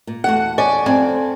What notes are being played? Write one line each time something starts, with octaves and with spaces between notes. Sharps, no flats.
A#2
E2 A3 F#4 F#5
C#4 D5
F2 C4 D5 G#5